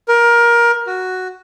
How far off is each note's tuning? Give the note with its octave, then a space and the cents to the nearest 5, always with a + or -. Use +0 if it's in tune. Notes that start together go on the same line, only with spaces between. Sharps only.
A#4 +20
F#4 +0